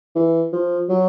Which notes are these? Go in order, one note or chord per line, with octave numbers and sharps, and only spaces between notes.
E3
F3
F#3